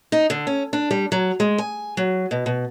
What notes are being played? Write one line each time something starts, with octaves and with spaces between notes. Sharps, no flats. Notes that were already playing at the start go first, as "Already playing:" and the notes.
D#4
D3
C#4
D4
G3
F#3
G#3
G#5
F#3
B2
B2